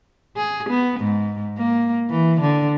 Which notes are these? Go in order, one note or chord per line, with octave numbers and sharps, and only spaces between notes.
G#4
B3
G#2
A#3
E3
D3